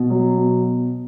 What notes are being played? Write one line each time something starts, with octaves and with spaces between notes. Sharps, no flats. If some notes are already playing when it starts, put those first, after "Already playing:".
Already playing: B2
F#3
B2